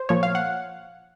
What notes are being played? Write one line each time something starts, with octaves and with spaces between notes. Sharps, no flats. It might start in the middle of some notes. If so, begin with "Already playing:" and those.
Already playing: C5
A#2 F3 C#5
F5
F#5